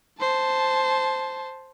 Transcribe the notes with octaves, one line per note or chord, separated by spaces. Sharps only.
C5 A5